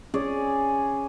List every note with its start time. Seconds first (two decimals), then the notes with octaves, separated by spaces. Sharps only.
0.14 C#4 G#4 D5